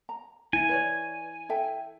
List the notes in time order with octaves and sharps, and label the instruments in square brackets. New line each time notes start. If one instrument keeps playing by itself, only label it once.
[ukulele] A#5
[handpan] E4 [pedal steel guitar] G#5
[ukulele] B4 C#5 D5
A4 E5 G5